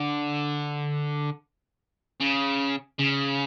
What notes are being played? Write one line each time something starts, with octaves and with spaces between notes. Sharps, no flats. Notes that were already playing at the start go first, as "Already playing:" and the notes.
Already playing: D3
C#3
C#3